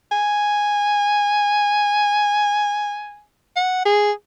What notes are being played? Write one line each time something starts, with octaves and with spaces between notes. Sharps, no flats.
G#5
F#5
G#4